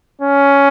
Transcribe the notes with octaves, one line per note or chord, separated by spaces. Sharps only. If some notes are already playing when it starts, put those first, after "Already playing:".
C#4